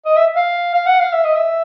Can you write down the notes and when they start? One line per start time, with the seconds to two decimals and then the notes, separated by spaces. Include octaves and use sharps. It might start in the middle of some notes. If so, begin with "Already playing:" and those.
0.05 D#5
0.16 E5
0.36 F5
0.74 F5
0.86 F#5
0.99 F5
1.13 E5
1.24 D#5
1.35 E5